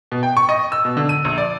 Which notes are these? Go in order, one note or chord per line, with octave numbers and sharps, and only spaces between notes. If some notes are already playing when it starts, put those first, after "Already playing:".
B2
G5
C#6
D#5
E6
B2
D3
D#7
A#1
D5